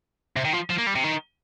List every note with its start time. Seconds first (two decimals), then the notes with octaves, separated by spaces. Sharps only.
0.37 C3
0.45 D#3
0.53 F3
0.70 F3
0.78 A#3
0.87 G3
0.95 C3
1.04 D#3